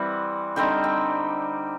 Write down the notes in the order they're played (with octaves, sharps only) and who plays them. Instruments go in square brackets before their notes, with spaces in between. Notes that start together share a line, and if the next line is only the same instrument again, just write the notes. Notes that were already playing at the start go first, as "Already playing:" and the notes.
Already playing: [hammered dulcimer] E3 G3 C4 F#5
D3 G3 C4 D#4 G5
G5